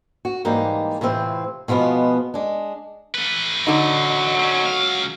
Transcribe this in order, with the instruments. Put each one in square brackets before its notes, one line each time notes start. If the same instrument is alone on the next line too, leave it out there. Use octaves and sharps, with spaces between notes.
[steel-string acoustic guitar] F#4
G#2 E3 G3 A#3 D#4 G4
A2 C3 E3 C4 F4
B2 F3 G#3 B3 F4
G#3 D4
[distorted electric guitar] A3 B4
[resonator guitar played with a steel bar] D3 D#4 [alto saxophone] F#3
[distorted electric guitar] C4 C#4
C#2 F5